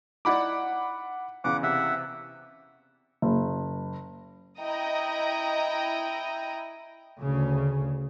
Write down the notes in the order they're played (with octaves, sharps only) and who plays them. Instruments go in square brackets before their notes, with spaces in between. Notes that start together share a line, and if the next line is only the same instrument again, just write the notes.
[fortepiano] D#4 E4 D5 [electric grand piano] F#5 B5 D6
[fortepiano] E2 C#3 [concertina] F#5 D6
[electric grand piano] C3 [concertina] E5 F#5
[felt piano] F#1
[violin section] E4 D#5 G5 A#5 D#6
[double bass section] D2 C#3